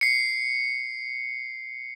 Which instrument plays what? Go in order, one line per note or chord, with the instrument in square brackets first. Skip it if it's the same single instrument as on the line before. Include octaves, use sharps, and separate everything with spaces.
[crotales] C7 C#7